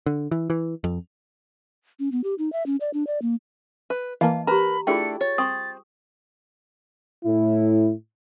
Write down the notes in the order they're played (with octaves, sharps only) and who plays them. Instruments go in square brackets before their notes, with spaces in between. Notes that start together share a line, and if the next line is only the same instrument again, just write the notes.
[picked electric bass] D3
E3
E3
F2
[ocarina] C#4
B3
G4
D#4
E5
C#4
D5
D4
D5
A#3
[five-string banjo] B4
[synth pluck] E3 A#3 [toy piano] D#5 A5 [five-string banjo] F5
[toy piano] G4 A#5 [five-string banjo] A#4 B4 [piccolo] B5
[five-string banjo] A3 D4 E4 [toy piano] F4 G#4 G5 [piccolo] C#7
[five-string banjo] C#5 [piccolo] A6
[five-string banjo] C4 [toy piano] C#6 D#6
[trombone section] A2 E4